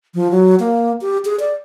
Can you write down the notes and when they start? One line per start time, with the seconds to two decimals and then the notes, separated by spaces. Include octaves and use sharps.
0.14 F3
0.31 F#3
0.60 A#3
1.01 G4
1.25 G#4
1.40 D5